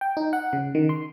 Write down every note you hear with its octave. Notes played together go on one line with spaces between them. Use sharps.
G5
D#4
F#5
C#3
D#3
C6